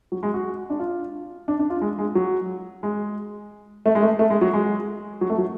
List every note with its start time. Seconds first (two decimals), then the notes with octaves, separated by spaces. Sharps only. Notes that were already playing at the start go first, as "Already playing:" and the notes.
0.12 F#3
0.23 G#3
0.34 F#4
0.70 D4
0.79 F4
1.48 D4
1.59 D4
1.70 F4
1.81 G#3
1.99 G#3
2.15 F#3
2.83 G#3
3.86 A3
3.95 G#3
4.02 A3
4.19 A3
4.30 G#3
4.41 F#3
4.53 G#3
5.21 F#3
5.30 A3
5.38 F#3